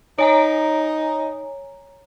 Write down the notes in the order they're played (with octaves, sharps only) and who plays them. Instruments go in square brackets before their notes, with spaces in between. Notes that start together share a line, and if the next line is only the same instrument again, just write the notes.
[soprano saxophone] D#4 [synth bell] C#5 G#5 A#5